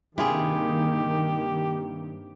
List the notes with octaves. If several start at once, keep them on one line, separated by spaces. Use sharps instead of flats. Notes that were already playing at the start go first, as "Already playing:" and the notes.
G2 C3 D#3 A#3 E4 F4 G4 G#4